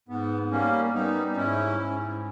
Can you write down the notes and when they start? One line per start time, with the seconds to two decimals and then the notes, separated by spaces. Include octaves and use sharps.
0.08 G#2 B3
0.51 G3 A#3 C#4
0.93 G3 B3 D#4
1.32 D#4
1.36 G#2 C#4 E4
1.79 G#2